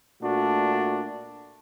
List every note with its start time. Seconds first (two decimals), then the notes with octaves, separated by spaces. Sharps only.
0.22 A#2 A3 D4 F#4